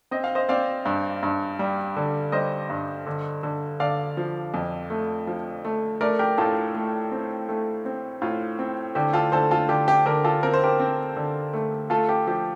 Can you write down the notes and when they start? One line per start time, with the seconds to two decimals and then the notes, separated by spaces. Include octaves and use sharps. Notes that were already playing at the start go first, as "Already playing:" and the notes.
0.11 C4 D#5
0.24 F5
0.35 C5 D#5
0.49 C4 D5 F5
0.85 G2
1.23 G2
1.59 G3
1.97 D3
2.32 G3 C5 D#5
2.70 G2
3.07 D3
3.43 D3
3.80 D3 D5 F5
4.17 F3
4.54 F2
4.90 A3
5.27 F3
5.65 A3
6.01 A3 A#4 D5
6.19 G4 A#4
6.38 A2 F4 A4
6.75 A3
7.12 C4
7.49 A3
7.85 C4
8.22 A2 F4
8.59 C4
8.95 D3 G4
9.13 F4 A4
9.32 D3 A4 C5
9.51 F4 A4
9.69 D3 G4
9.88 G4
10.06 D3 G4 A#4
10.24 F4 A4
10.43 C4 A#4
10.54 C5
10.64 G4 A#4
10.79 C4
11.17 D3
11.53 A3
11.90 A3 F4 A4
12.09 G4
12.27 F3 G4